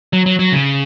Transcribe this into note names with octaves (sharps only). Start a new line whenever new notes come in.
F#3
F#3
F#3
C#3